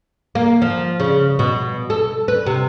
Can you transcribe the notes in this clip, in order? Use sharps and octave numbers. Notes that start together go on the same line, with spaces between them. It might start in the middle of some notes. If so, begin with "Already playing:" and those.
A#3
F3
C#3
B2
A4
B4
C3